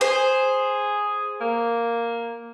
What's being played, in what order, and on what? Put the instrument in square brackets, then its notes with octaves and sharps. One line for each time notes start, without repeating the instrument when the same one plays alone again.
[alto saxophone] G#4 [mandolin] C5
[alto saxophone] A#3